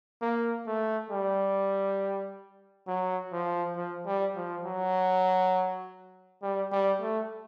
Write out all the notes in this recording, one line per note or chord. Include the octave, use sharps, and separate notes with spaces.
A#3
A3
G3
F#3
F3
F3
G3
F3
F#3
G3
G3
A3